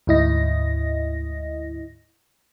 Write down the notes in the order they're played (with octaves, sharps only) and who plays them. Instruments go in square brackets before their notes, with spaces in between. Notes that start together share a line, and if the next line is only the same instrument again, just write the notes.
[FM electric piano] D2 G#2 E4 D#5 A#6